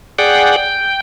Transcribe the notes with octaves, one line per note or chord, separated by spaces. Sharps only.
G#4 D5 F#5 G5
G5